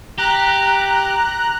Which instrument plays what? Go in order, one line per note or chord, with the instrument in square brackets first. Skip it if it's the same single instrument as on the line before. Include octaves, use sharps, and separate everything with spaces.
[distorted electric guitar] G4 [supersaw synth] A#5 F#6